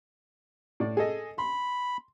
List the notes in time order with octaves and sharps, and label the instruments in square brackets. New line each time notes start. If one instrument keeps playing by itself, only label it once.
[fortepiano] A2 D5
G#4 A4 D#5
[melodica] B5 [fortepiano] C6